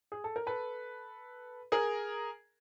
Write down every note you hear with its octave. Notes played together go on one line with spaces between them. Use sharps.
G#4
A4
A#4
A4 B4
G#4 A#4